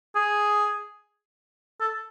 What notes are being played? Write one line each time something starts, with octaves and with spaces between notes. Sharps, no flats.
G#4
A4